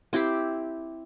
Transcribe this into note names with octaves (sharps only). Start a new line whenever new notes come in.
C4 E4 G4 C5